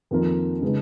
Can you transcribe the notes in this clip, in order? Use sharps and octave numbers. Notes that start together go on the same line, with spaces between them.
F2 D#3 A#3 F4 A#4
C#3 G#3 D#4 G#4 B4